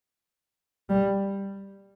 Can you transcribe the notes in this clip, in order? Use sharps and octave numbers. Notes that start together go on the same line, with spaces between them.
G3